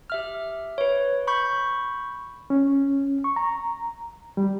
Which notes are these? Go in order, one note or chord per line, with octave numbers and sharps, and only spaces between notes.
G4 E5 F6
B4 C#5
B5 C#6 G6
C#4
C#6
A#5
G3